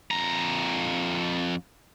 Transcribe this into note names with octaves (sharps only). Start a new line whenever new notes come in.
F2 A#5